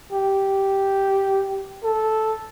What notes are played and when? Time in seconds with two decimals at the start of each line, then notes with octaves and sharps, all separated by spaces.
0.13 G4
1.83 A4